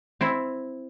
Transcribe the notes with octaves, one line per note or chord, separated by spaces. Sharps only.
C4 E4